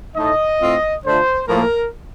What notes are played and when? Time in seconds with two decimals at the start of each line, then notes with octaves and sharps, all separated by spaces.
0.16 A2 A3 D#4 D#5
0.60 A2 A3 C4 F4
1.04 D3 A3 D4 F4 C5
1.48 A2 F3 A#3 A#4